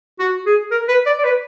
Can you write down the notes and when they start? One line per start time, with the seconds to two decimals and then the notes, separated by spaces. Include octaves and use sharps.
0.19 F#4
0.46 G#4
0.71 A#4
0.88 B4
1.06 D5
1.18 D5
1.24 B4